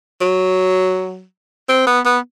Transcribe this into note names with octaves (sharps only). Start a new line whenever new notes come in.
F#3
C4
B3
B3